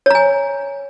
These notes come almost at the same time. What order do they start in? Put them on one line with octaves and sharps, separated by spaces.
C#5 A#5 G#5